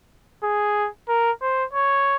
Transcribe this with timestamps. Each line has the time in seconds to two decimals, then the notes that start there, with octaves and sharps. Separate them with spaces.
0.43 G#4
1.08 A#4
1.42 C5
1.73 C#5